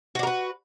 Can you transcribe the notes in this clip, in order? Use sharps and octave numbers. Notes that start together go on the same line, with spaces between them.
D4 F#4 A#4 B4